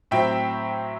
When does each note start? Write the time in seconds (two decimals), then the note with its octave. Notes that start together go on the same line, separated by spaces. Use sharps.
0.11 A2 F#3 C4 E5 G5